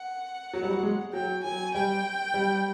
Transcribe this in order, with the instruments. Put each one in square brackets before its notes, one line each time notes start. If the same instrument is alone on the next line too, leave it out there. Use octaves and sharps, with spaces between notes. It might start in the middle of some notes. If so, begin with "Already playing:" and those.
Already playing: [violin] F#5
[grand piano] F#3
G3
F#3
G#3
[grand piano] F#3 [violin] G5
[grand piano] F#3 [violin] G#5
[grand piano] G3 [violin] G5
[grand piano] G3